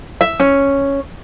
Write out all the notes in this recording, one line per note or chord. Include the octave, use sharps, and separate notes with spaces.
E5
C#4